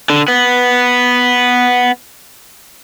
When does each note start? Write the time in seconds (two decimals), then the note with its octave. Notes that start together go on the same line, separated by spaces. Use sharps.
0.10 D3
0.28 B3